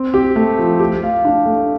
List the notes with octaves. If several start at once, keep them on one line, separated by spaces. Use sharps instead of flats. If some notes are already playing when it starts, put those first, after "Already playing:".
Already playing: C4
G4
A3
F3
G4
F5
D4
A3